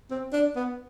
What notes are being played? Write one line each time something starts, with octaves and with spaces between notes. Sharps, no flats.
C4
D4
B3